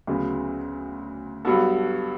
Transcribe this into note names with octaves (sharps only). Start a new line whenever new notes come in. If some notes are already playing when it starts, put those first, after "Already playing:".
D2 C#3 F#3 B3
G2 F#3 B3 F#4 A4